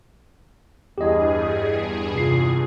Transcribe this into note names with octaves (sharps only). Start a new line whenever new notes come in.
E2 G2 G4 G#4 D#5
C3 F4 C7